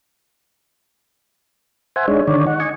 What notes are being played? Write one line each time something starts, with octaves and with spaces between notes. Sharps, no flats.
C5 E5 F#5 G#5
G#3 D4 D#4 C#5
D3 D#3 C#5 D5
D#4 F#5
D#5 G#5 C#6